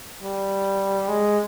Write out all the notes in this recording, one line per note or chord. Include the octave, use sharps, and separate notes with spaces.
G3
G#3